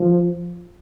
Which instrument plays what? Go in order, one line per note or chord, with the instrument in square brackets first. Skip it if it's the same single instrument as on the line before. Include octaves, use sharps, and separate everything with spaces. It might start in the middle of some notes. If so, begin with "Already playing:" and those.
Already playing: [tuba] F3